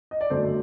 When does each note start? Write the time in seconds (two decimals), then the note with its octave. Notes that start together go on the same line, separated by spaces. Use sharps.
0.11 D#5
0.21 D5
0.30 G1 F#2 F#3 A3 A4 C5